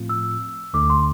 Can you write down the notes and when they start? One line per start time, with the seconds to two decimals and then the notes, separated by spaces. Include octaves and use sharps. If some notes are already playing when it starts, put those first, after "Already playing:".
Already playing: A2 F3 A3 C4 F4
0.09 E6
0.73 D2 D3 A3 D4 D6
0.90 C6